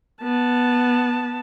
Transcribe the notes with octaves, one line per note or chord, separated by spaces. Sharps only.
B3 A5